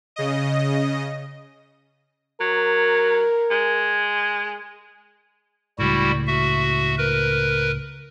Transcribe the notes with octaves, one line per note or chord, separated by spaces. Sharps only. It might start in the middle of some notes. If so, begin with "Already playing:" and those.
C#3 D#5
F#3 A#4
G#3
C#2 A2 G3 E4 F#4
F#4 E5
A#4 B4